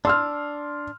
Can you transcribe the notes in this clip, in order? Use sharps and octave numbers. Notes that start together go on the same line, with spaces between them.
D4 C6 E6 F6